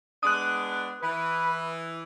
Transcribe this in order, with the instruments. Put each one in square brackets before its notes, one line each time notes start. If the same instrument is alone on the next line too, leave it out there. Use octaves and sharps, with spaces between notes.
[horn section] G#3 B3 D4 [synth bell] D#6 F#6
[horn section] E3 [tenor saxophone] B4